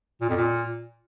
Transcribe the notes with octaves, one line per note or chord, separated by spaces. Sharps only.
A#2
F2
A#2